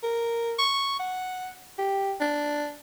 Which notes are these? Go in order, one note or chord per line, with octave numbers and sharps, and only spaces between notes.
A#4
C#6
F#5
G4
D4